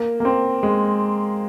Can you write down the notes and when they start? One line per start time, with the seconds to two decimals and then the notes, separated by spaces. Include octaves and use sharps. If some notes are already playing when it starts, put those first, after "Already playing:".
Already playing: A#3
0.20 A#3
0.25 C4
0.63 G#3